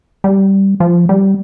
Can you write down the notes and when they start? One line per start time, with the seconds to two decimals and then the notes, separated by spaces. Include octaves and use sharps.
0.24 G3
0.80 F3
1.09 G3